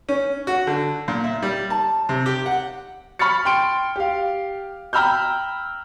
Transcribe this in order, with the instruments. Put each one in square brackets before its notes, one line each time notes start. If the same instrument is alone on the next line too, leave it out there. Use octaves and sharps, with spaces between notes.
[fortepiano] C#4
F#4
D3
A#2
E5
G3
A5
C3
G4
F#5
[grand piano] B5 C#6 F6 A6 C#7
G5 C6 D7
G4 F5
G5 A#5 B5 E6 F6 G6